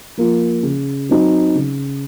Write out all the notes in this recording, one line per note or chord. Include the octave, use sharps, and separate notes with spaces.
F3 A#3 F4
C#3
F#3 C4 D#4 F#4
C#3